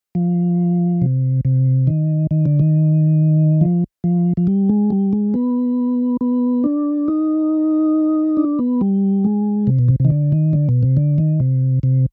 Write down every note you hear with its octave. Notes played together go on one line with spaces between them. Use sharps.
F3
C3
C3
D#3
D#3
D3
D#3
F3
F3
F3
G3
G#3
G3
G#3
B3
B3
D4
D#4
D4
B3
G3
G#3
C3
B2
C3
C3 D#3
D3
D#3
D3
B2
C3
D3
D#3
C3
C3